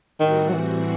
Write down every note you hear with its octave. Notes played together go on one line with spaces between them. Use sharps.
A2 D#3 G3 C4 F#4
F#3
E3